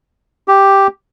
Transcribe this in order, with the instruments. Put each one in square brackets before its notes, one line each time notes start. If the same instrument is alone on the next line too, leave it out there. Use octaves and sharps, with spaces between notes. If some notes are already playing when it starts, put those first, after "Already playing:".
[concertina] G4